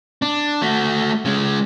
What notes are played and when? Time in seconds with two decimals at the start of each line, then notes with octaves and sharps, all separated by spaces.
0.22 D4
0.62 A3 F#4
1.25 C#3 G#3